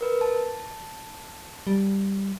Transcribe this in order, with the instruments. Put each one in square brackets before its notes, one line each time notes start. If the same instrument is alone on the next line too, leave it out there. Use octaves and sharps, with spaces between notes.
[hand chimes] A#4 B4
A5
[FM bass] G3